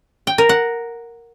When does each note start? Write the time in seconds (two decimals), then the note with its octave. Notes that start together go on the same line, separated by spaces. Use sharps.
0.27 G5
0.38 A#4
0.49 F#5